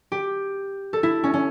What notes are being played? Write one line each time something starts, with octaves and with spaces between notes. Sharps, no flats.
G4
A4
E4
C#4
C#4